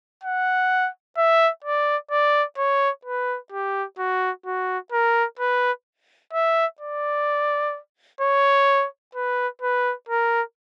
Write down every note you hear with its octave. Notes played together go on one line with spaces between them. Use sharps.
F#5
E5
D5
D5
C#5
B4
G4
F#4
F#4
A#4
B4
E5
D5
C#5
B4
B4
A#4